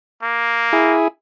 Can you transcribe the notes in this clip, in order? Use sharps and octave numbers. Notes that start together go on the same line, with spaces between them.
A#3
E4 G#4